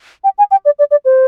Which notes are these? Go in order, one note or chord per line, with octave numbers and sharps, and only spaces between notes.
G5
G#5
G5
D5
D5
D5
C5